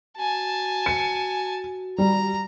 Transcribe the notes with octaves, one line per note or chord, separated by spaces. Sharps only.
F#4 G#5 A5
C#7
G3 A#5